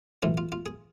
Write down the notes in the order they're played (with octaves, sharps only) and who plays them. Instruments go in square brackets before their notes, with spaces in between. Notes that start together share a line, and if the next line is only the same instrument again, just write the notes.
[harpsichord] B1 A2 E3 F4
F4
F4
G#4